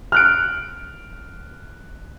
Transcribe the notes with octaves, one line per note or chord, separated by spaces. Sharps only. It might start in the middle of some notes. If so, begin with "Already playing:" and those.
F6 F#6 D7